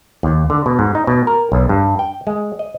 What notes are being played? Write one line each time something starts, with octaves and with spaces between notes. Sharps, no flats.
D#2
D3
B2
G#2
D#4
B2
A#4
B1
G2
G5
G#3
D#5